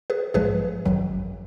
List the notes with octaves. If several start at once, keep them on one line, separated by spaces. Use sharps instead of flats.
G#4 B4
A#1 G#2 F3 G#3 G#4 B4
G#1 F#2 D#3 F#3